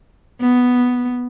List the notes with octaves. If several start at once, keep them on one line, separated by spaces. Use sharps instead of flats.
B3